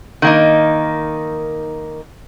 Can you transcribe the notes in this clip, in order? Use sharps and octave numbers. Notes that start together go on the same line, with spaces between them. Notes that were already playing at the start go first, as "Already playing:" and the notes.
D#3 A#3 D#4